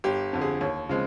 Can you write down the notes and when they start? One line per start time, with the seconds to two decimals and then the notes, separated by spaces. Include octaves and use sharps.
0.04 G1 G4
0.33 F2 D3
0.41 G#4
0.61 D#2 C#5
0.89 C#3 F3 G#3 C4